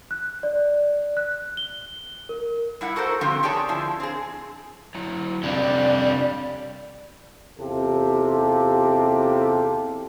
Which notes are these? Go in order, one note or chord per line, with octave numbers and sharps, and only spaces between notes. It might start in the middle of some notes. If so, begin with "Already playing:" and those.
F#6
D5
F#6
G7
A#4
G3 E4 F#5
F#4 A4 A#4 C5
D3 F3 G3 B3 C4
G4 G#4 C#5 D5 A5
D3 F3 E4
C4 G#4
F#3 E4 A#5
F2 C3 G3 D4 D5
E2 C3 F4 G4 A4